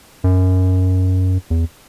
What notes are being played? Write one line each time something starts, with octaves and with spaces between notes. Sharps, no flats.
F#2
E2